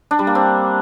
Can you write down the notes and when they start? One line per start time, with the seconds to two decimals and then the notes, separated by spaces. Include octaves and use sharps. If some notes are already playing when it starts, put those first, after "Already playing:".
0.11 D4
0.19 G3
0.27 A#3
0.35 C4